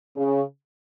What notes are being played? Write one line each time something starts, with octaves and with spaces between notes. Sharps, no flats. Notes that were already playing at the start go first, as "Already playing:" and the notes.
C#3